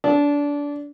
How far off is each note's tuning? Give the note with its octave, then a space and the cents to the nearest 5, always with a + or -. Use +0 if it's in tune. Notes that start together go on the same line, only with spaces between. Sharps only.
D4 -25